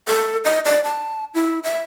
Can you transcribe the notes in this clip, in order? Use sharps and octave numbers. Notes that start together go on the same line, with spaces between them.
A4
D#5
D5
A5
E4
E5